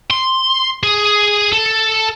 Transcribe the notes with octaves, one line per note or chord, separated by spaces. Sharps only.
C6
G#4
A4